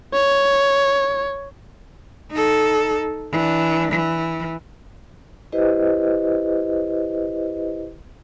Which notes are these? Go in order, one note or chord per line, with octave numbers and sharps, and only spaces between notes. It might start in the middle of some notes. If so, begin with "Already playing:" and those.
C#5
D#4 A4
E3 D4
E3
E4 G4 B4 C5 D#5